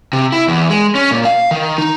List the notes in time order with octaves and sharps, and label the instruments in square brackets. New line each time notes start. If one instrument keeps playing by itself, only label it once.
[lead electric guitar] C3
E4
E2
G#3
C#4
A#2
F5
D#3
D#4